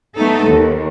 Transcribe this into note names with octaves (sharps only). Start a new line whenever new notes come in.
A3 B3 D#4 A4
D#2